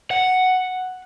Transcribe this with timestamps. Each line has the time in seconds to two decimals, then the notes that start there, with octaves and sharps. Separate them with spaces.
0.11 F#5